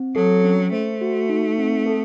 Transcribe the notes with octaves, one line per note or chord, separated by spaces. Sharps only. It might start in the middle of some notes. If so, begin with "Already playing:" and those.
Already playing: C4
F#3 A4
C#4
A3 C5
F#4
D#4
C4
A4